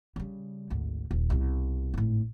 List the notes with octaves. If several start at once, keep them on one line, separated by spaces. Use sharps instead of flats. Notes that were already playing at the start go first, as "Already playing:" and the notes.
C#3 G3
G#1 D2
D#1
C2 B2
G#1 A2